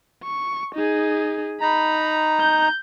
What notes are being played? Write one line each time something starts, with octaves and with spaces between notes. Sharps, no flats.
C#6
D#4 G#4
D#4 A#5 B5
G6